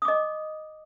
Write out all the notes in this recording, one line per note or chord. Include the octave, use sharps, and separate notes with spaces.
D#5 D6 D#6